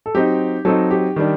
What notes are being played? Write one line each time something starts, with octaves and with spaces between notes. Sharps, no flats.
A4
F#3 C4 D#4 G4
F#3 C4 D#4 A4
G4
D#3 G3 D4